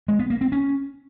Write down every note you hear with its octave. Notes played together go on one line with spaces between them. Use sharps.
G#3
B3
A#3
C4
C#4